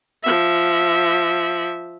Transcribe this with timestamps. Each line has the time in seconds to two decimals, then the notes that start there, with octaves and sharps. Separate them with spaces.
0.23 F3 E5